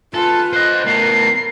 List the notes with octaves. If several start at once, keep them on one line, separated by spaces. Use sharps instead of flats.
F4 A4 B4 G#5
C5 D#5 F#6
A2 B3 A#4 C7